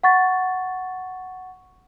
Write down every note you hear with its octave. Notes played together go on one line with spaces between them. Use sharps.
F#5 C#6 A6